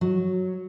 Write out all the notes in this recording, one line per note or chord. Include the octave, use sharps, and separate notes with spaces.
F#3